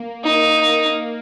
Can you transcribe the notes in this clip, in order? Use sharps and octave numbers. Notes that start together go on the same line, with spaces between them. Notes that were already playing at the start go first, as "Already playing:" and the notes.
Already playing: A#3
D#4
A#3